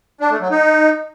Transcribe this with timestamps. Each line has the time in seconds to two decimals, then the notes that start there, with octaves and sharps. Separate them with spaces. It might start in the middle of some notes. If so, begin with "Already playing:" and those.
0.21 D4
0.31 A3
0.41 F#3
0.51 D#4